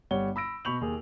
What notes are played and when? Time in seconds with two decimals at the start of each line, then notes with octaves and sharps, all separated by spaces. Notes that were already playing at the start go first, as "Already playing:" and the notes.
0.11 G1 G3 C#5 F#5 G7
0.36 B5 E6 A#6 D7
0.65 B2 B5 C#6 G6 F7 F#7
0.81 D#2 G#4